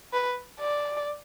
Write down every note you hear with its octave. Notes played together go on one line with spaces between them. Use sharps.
B4
D5